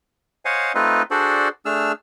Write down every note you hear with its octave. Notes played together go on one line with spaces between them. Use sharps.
C5 C#5 D#5 F5 F#5 G#5
A3 C4 D#4 F4 B4 D#5
D4 F#4 G#4 A4 C5 D5
A3 D4 G#4 E6 F6